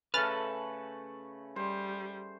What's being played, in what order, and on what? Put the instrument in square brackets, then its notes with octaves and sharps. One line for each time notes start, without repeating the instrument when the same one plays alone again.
[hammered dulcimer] C#3 A3 [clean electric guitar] A4 B4 [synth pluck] F6 A6
[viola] G3 [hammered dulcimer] C5